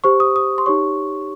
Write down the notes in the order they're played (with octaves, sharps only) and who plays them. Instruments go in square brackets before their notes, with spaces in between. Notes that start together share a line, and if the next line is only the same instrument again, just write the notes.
[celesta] G4 C5 C#6
D#6
D#6
C6
D#4 G4 C#5 C#6